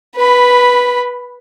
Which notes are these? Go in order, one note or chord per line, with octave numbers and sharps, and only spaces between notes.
B4 B5